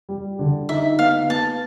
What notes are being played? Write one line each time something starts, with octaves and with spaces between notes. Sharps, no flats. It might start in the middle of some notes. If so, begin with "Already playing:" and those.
G3
D3
D#4 E5
B3 F5
B3 A5